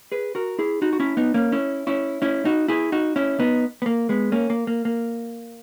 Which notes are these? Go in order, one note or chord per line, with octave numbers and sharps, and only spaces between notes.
G#4 B4
F#4 A#4
E4 G#4
D#4 F#4
F#4
C#4 E4
B3 D#4
A#3 C#4
C#4 E4
C#4 E4
C#4 E4
D#4 F#4
E4 G#4
D#4 F#4
C#4 E4
B3 D#4
B3
A#3
G#3 B3
A#3 C#4
A#3
A#3
A#3